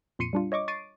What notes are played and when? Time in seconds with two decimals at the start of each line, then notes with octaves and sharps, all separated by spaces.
0.19 F2 A#2 C6 C7 C#7 D#7
0.33 G3 D4 F4
0.52 C#5 D#5 C#6 D6
0.68 C#6 A6 C7 D7 D#7